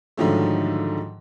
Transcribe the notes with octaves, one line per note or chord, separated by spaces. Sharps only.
G#2 D3 D#3 F3 F#3 A3